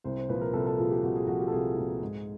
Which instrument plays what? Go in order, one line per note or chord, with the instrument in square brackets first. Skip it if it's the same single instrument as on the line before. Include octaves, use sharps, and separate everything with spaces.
[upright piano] C2 C5
C5
A#2 F3 B4
A#4
C2 A4
A4
A#2 F3 G#4
G4
C2 F#4
G#4
A#2 F3 F#4
G4
A4
C2 G#4
A#2 F3
G#2